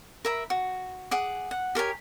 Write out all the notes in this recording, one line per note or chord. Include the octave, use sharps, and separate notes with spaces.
A#4 E5 B5
F#4
G#4 F#5 D6
F#5
G4 A#4 C#5 G#5